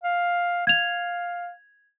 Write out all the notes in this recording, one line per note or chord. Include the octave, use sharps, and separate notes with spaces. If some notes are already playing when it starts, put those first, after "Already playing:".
F5
F5 G#6 F7